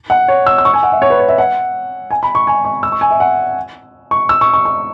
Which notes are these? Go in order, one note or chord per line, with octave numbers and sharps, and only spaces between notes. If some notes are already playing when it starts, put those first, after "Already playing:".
F#5
C#5
E6
E6
C#6
G#5
F#5
E5
C#5
B4
C#5
E5
F#5
G#5
B5
C#6
G#5
C#6
E6
C#6
G#5
E5
F#5
C#6
E6
C#6
C#6
C#6